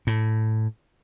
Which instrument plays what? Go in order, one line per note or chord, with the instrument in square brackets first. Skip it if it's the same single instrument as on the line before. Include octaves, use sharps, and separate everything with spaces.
[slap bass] A2